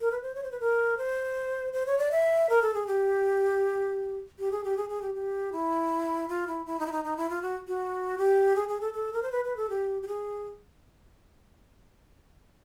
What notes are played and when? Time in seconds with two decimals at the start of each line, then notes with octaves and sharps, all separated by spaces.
0.01 A#4
0.11 B4
0.22 C5
0.35 C#5
0.44 C5
0.51 B4
0.60 A#4
0.98 C5
1.73 C5
1.86 C#5
1.98 D5
2.11 E5
2.49 A#4
2.62 A4
2.74 G#4
2.87 G4
4.39 G4
4.51 G#4
4.64 G4
4.77 G#4
4.89 G#4
5.02 G4
5.15 G4
5.52 E4
6.28 F4
6.47 E4
6.66 E4
6.80 D#4
6.86 E4
6.92 D#4
7.04 D#4
7.17 E4
7.30 F4
7.42 F#4
7.68 F#4
8.18 G4
8.56 G#4
8.69 G#4
8.81 A4
8.94 A4
9.13 A#4
9.23 C5
9.32 B4
9.45 B4
9.57 A4
9.70 G4
10.02 G4
10.08 G#4